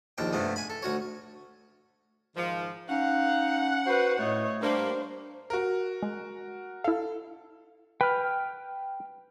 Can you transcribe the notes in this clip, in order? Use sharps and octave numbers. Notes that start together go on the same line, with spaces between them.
A#1 D#2 D4 G5
G2 C3 A3 B3
G#5 B5
A4
D2 F#4 C#5
G#2 D#3 F3
C#4 D#4 F5 F#5
F#4 B4 C5
A2 A3 C#5 D#5
G3 A#3 D4 C5
F#4 A#4
G#3
E4 A4 F5
B4 G5 F6